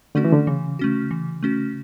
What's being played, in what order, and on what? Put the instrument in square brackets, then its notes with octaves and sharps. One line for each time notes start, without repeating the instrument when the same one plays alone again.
[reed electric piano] D3 [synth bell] A3 C#4 F#4
[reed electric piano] E3
D3
[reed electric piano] C#3 [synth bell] E3
[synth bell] A3 C#4 F#4
E3
A3 C#4 F#4